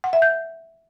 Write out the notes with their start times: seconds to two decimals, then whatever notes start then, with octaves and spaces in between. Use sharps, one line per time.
0.04 F#5
0.13 E5
0.22 G6